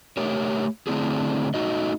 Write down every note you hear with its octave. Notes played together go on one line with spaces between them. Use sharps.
A3 G4 A#4 C#5
D3 A3 C4 D4 E4 G#4
A3 D#4 F#4 D#5